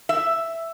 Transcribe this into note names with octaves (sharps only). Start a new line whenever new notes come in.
E5